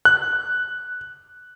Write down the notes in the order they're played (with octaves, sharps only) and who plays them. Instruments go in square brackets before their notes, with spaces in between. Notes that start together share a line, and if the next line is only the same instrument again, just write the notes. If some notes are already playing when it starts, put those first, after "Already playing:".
[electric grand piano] F#6